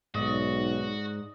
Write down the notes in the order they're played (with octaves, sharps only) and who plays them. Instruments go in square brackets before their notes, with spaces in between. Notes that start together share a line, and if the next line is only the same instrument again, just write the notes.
[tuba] B1 [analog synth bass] G#2 [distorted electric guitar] F#4 [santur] D5 D#5